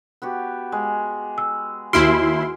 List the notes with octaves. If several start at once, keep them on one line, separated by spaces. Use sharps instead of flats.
B3 F#4 G4
G#3
E6
D#2 E4 F#4 C6 F6 D7